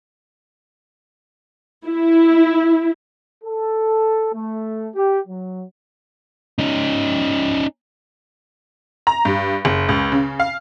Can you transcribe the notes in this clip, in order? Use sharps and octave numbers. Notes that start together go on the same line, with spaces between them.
E4
A4
A3
G4
F#3
C#4 D#4
A#5
G2
F#1
C#2
C#3
F5